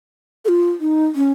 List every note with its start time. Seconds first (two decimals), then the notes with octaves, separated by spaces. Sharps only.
0.45 A4
0.48 F4
0.80 D#4
1.16 C#4